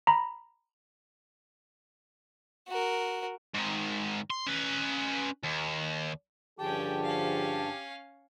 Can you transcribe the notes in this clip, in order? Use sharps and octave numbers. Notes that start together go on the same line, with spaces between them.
A#5 B5
F#4 A#4
G#2 D#3
C6
C#4 B4
D#2
G2 D3 F3 C#4 G4 G#4 G5 A5
C#4 F5